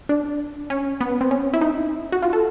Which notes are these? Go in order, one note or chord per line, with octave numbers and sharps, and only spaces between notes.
D4
C#4
B3
C4
C#4
E4
D#4
F#4
F4
A4